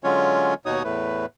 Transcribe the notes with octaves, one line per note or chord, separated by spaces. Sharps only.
D3 F#3 G#3 C#4 F4 C#5
D#2 B2 D#4 F#4 C#5 D#6
E2 A2 A3 B4